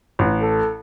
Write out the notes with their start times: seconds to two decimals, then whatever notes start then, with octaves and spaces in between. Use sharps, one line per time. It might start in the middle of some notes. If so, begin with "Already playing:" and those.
0.19 A1
0.40 A4